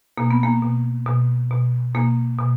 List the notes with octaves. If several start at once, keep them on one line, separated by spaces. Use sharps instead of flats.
B2 A#3
B3
A#3
B2
B2
B2
B2 A#3
B2